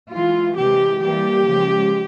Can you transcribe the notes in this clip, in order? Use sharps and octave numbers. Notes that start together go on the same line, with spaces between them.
E3 G#3 F4
C3 E3 G#3 G4
E3 G3 A#3 G4
C#3 F3 G#3